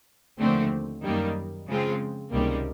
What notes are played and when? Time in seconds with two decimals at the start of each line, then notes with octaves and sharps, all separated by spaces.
0.38 D#2 D3 F3 A3 C4
1.03 F#2 D#3 G3 A#3
1.67 C#3 F3 G#3 C4 F4
2.31 C#2 C3 D#3 G3 A#3